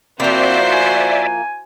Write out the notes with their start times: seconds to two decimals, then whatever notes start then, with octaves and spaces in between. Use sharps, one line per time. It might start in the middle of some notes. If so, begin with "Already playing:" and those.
0.20 F3 A#3 C4 E4 F#4 C5 D5 E5
0.73 G#5